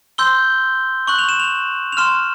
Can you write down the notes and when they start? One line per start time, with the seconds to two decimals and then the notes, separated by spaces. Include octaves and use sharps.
0.18 C6 E6 G6 G7
1.07 C#6 F#6 F#7
1.19 F7
1.29 E7
1.40 F7
1.92 F7
1.97 C6 F6 E7